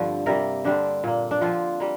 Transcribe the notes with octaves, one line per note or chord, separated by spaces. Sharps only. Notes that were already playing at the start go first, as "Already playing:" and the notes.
Already playing: G2 D3 F3 C4
C3 G3 A#3 A#4
D3 G3 C4 D4
A#2 A#3
D4
D3 F3 C4 F4
G3 A#3